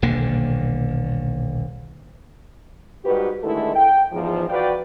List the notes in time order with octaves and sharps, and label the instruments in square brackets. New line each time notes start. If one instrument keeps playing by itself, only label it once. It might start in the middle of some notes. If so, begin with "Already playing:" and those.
[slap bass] D#1 B1 D3 A#3
[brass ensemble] G#2 G3 F#4 G4 B4
D3 D#3 G#3 A3 E4 A4
G5
E2 G#2 F3
F#4 B4 D5 F5 G5